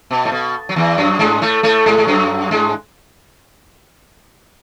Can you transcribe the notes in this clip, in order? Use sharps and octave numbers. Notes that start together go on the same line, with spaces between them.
B2
A2
B2
F#3
E2 E3
F#2 F#3
G#2 G#3
A2 A3
A2 A3
G#2 G#3
G#3
F#2 F#3
G#2 G#3